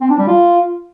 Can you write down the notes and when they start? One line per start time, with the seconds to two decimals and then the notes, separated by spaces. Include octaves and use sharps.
0.01 C4
0.10 D4
0.18 G3
0.27 F4